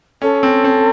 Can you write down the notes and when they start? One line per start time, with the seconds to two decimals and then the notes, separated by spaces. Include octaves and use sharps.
0.22 C#4 A4
0.43 C4
0.64 C4